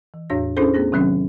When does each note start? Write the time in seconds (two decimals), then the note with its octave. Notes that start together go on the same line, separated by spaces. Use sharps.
0.14 E3
0.30 E2 A2 D4 F#4 C#5 A#6
0.57 C#4 D4 E4 G#4 A4 C5
0.74 A3 B3 G#4 A#6
0.92 C3 D#3 F#3 C4 C#4